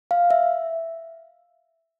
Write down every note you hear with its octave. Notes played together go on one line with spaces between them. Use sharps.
F5
E5